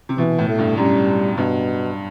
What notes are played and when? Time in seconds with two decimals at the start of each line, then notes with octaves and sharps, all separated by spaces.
0.09 C3
0.18 B2 E3
0.39 A2
0.48 A3
0.59 G2
0.78 F#2 G3
1.08 F#2
1.38 G2 B2